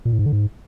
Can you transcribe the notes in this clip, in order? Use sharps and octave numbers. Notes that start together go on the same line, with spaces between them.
A#2
A2
G#2
D3
G#2